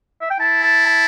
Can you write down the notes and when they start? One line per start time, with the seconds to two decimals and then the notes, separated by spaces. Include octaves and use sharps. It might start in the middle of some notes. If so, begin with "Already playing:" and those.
0.21 E5
0.30 G5
0.40 E4 A5
0.63 A5
0.86 A5